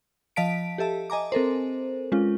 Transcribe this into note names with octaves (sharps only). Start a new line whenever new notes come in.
F3 D#5 F5 A5 B6 D7
G4 A4 E5 A5
D#5 G#5 A#5 D6
C4 A4 A#4 C5
G#3 C#4 F4